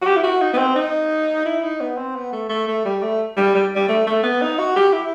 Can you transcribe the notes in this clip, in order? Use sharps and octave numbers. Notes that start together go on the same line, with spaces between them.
F#4
G4
E4
F#4
D#4
B3
C4
D#4
E4
D#4
B3
C4
B3
A3
A3
A3
G3
A3
G3
G3
G3
A3
A3
B3
D#4
F#4
G4
E4